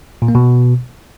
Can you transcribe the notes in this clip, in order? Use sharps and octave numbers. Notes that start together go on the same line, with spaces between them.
A#2
A#3
B2